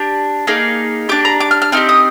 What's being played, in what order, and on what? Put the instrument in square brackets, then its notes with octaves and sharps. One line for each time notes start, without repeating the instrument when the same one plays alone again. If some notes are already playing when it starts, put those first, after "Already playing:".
Already playing: [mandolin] D4 G4
A#3 D#4 G#4
D4 G4 D6
A#5
D6
F6
F6
C4 D#4 G4 F6
D#6